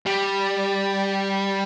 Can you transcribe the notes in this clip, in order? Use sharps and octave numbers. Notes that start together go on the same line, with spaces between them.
G3